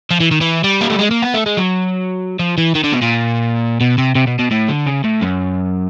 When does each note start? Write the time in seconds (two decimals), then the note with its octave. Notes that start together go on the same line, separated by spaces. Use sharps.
0.11 F3
0.20 E3
0.31 D#3
0.41 E3
0.64 G3
0.81 A#3
0.90 A3
0.99 G#3
1.11 A#3
1.22 B3
1.34 A3
1.46 G#3
1.57 F#3
2.40 F3
2.58 E3
2.75 D#3
2.84 D3
2.93 B2
3.02 A#2
3.81 B2
3.98 C3
4.15 C3
4.27 B2
4.39 B2
4.51 A2
4.69 D3
4.86 C#3
5.04 A2
5.21 F#2